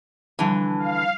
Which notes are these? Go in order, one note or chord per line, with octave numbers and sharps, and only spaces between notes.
D3 E3 F3 G3
F5